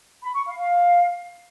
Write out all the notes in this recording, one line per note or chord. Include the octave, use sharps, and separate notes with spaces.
B5
C#6
F5
F5